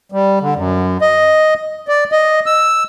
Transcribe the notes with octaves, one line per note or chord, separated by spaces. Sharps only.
G3
D3
F#2
D#5
D5
D#5
E6